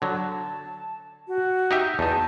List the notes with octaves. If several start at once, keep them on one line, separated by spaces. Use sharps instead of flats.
D3 F#3 A5
F#4
D#4 G4 E5
E2 D#4 A5